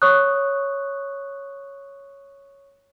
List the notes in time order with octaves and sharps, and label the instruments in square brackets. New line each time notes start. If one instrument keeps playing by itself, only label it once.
[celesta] C#5 C#6 D#6 F#6